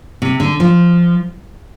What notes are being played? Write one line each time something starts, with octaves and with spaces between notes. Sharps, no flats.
C3
D3
F3